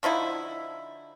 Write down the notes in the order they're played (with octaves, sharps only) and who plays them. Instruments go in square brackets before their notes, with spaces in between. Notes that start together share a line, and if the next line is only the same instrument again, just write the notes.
[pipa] D3 F3 D#4 E4